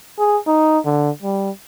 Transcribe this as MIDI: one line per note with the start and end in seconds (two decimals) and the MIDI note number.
0.19 0.37 68
0.47 0.79 63
0.85 1.10 50
1.22 1.50 55